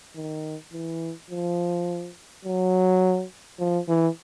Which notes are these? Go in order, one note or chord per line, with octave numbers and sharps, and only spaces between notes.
D#3
E3
F3
F#3
F3
E3